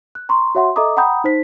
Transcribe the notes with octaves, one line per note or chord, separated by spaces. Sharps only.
F#6
A#5 C6 C#6
F#4 C#5 E5 F#5 C6
A4 D#5 E5 A#5 D6 D#6
F#5 G5 A#5 B5 D#6 G6
D#4 C5 B6